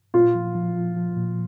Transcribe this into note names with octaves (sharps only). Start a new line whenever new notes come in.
A#2 F4
F3
F3
F3
F3
A#2